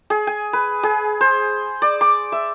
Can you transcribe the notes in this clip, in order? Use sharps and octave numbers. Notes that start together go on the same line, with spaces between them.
G#4
G#5
B4
G#4
C5
D5
D6
E5